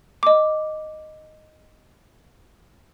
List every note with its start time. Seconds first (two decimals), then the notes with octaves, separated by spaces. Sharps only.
0.23 D#5 D6